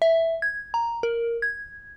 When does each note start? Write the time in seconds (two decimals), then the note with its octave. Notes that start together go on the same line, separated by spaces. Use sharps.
0.02 E5
0.42 G#6
0.74 A#5
1.03 A#4
1.42 G#6